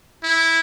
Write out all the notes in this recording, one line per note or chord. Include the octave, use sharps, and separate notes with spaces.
E4